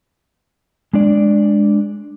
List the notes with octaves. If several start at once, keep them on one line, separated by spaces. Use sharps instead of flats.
G#3 D4 D5